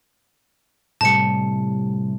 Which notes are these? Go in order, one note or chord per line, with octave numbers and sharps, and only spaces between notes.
A2 C3 G3 A5 C#7